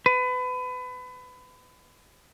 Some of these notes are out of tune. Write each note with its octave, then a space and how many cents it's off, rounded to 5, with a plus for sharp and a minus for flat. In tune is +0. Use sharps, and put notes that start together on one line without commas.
B4 +30